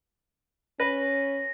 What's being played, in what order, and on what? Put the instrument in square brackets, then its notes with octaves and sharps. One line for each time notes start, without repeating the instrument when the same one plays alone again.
[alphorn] C#4 [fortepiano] B4 [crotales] A#6